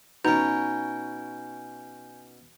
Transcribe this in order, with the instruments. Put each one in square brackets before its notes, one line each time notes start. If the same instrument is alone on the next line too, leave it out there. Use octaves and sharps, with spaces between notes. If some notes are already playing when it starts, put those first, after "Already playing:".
[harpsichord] B2 C#4 [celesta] D#4 [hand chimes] G#5 G6 [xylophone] A#5